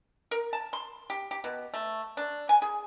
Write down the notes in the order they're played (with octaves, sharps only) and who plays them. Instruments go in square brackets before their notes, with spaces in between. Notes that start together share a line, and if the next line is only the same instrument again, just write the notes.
[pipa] A#4
A5
C6
G4
G4
B2
A3
D4
G#5
G#4